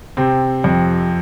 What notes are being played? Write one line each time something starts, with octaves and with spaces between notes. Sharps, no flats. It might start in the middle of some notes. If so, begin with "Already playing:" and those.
C3 C4
F2